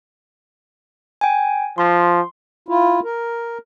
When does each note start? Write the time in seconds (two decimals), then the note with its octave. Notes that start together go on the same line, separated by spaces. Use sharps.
1.21 G5 G#5
1.78 F3 C6
2.69 E4 F4
3.04 A#4